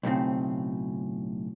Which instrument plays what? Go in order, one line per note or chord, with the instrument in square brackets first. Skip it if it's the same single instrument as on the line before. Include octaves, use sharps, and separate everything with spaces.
[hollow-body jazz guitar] B1 A2 C#3 C4